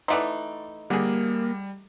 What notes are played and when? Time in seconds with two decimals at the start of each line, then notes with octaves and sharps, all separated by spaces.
0.08 E3 A3 D#4 D5 F#5 C6
0.90 D3 G3 A#3 G#4